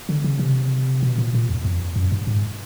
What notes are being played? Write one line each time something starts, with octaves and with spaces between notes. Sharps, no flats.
D3
C#3
C3
B2
A#2
A#2
E2
F2
F#2
G2
G#2